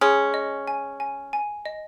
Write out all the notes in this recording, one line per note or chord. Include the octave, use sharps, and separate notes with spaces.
G#3 C#4 G#4
D#5
G#5
G#5
G#5
D#5